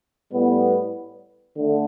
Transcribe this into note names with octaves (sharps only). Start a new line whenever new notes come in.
A2 G3 B3
D3 A3